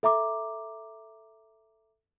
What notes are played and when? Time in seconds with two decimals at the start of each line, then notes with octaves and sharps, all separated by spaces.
0.03 A4 E5 A#5 D6